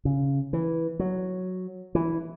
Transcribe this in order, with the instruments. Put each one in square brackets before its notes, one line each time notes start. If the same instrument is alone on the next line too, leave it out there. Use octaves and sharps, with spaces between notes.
[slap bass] C#3
E3
F#3
E3